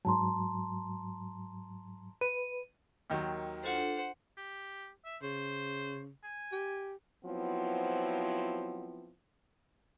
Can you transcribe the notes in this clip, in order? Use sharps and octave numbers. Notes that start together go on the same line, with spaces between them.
G#2 F#3 A5 A#5 C6
B4 D#7
D#2 D#3 F#3
D4 F4 A4 C5 F#5
G4
E5
C#3 C5
G#5
G4
F3 F#3 B3 C4 E4 F4